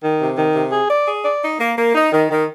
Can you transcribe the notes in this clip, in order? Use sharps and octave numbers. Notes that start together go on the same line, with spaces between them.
D#3
C3
D#3
C3
G#4
D5
G#4
D5
D#4
A#3
A#3
D#4
D#3
D#3